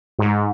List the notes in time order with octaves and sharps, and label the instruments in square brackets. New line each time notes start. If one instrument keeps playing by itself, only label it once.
[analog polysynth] G#2